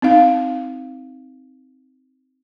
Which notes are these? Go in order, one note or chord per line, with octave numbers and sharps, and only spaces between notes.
C4 D#4 F5